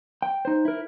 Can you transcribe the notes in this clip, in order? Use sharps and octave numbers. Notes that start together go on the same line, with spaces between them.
G5
D#4 C5
E4 A#4